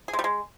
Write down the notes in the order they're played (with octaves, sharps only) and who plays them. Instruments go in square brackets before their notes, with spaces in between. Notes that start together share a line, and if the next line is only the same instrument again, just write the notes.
[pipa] G#4
G#3
G3
G#3